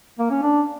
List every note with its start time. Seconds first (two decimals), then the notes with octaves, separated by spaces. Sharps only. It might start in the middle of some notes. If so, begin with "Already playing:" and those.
0.19 A#3
0.31 C#4
0.42 D4